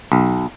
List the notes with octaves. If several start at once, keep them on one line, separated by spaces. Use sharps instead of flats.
B1